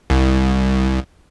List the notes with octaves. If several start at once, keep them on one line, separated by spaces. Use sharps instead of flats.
C2